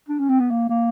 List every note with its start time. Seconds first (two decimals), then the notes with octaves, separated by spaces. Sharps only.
0.09 D4
0.19 C#4
0.29 C4
0.40 B3
0.50 A#3
0.69 A#3